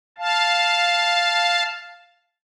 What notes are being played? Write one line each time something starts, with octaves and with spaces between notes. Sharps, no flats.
F5 A5